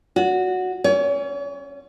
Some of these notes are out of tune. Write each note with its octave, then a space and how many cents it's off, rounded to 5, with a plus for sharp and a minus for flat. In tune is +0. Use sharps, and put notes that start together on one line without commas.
F#4 -10 D5 -45
C#4 -20 C#5 +40